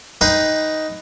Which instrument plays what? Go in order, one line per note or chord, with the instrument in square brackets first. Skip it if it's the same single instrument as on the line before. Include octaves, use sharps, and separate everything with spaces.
[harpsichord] D#4 B4 D#5 G5 C6